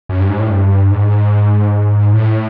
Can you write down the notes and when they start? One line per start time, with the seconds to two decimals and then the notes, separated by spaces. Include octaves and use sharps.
0.09 F#2
0.20 G2
0.30 G#2
0.40 A2
0.50 G2
0.91 G#2
2.13 A2